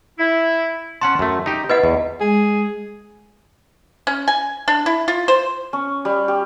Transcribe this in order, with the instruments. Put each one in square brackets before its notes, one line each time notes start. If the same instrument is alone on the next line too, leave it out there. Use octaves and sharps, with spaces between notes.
[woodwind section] E4
[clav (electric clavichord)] C#4 F#5 A5 [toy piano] C6
[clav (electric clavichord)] F#2 A3
D#4 G4
[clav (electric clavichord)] E4 [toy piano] B4 D#5 F#5
[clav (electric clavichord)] E2
[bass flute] G#3 [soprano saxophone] G#4
[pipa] C#4
G#5
D4
E4
F4
C5
[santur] C#4
G3
G4